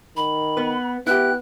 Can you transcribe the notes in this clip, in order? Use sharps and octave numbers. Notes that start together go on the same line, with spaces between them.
D#3 B5
B3 B4
B3 E4 G4 F#6